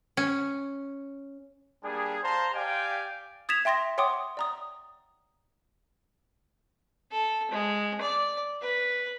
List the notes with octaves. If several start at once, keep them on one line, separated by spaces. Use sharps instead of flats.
C#4
G3 A#3 D4 G#4
C5 F5 A5 A#5 C6
G4 D5 F5 G5 G#5
D#6 G#6 A6 B6 E7 F7
E5 G5 C6 A6 A#6
C#5 F#5 G5 C6 D6 D#6
D5 A#5 D#6
A4
G#3
D5
B4